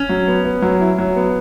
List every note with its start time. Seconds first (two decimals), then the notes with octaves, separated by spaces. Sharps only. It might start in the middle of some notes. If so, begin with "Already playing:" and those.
Already playing: C#4
0.09 F#3
0.28 B3
0.45 B3
0.62 F#3
0.80 E4
0.98 F#3
1.16 B3